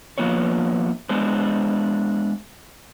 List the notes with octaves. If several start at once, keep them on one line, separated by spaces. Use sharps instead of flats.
F3 A#3 B3 C#5
G#3 B3 D4 C5